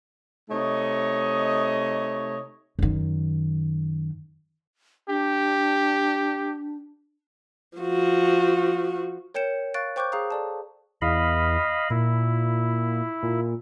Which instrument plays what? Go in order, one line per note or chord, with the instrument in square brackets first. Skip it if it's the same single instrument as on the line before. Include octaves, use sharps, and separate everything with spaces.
[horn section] C3 A3 D#4 C#5 D#5
[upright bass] F#2 D#3
[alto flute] D4 [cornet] G4
[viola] F3 F#4
[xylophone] A#4 C#5 G5 G6 C#7 E7
F5 C#6 F#6 A6 D7
C5 G5 C#6 D6 F#6 G6
G#4 F5 A#5 D#6
A4 D5 A5
[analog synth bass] E2 [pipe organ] D#5 F5 B5
[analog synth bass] A#2 [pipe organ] E4
[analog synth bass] A#2